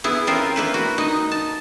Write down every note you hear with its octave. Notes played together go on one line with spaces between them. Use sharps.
B3 E4 G#4
C4 C#4 F4 A#4 C5
A#3 E4 B4
F#4
D#4 D#5
A5